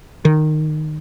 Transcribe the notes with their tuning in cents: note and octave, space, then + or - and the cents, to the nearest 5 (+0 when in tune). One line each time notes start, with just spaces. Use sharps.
D#3 -15